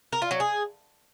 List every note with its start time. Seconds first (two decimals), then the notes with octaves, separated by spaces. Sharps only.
0.13 A#4
0.22 F4
0.31 F#3
0.40 G#4